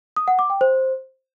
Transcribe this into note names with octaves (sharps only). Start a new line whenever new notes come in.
D#6
F#5
D6
G5
C5